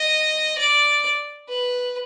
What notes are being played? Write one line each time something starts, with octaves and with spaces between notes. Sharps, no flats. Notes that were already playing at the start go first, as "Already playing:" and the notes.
Already playing: D#5
D5
B4